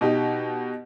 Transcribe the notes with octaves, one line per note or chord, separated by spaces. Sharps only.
B2 D#4 G4